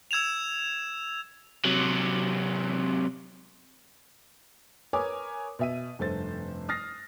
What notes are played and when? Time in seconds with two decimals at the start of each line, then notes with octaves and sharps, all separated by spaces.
0.11 E6 G#6 E7 F7
1.65 C3 F#3
4.93 A#4 B4 C#5 G#5 D6 D#6
5.59 B2 E5 D#7
5.99 F1 G2 A4 C5 A6
6.69 D#6 F6 A6 A#6 C7